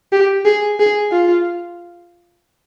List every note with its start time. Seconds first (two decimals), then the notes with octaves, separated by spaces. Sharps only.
0.12 G4
0.45 G#4
0.80 G#4
1.12 F4